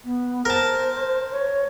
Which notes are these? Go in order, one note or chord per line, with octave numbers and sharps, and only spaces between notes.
B3
A#4 C5 A5
C#5